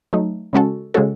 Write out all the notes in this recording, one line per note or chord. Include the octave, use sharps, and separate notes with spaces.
F#3 A3 D#4
C#3 G#3 C#4 F#4 A4
C#3 G#3 C#4 F#4 A4